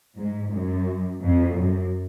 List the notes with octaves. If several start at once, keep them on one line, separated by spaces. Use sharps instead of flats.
G#2
F#2
F2
F#2